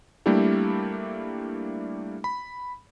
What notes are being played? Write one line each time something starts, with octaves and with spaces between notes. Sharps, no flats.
G3 A3 A#3 D4 E4 G4
B5